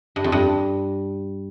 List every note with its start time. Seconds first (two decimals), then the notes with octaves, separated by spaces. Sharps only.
0.16 G2
0.24 F2
0.32 G2